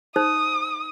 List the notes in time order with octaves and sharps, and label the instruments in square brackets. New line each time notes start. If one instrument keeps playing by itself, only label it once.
[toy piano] D#4 C5 [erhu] D#6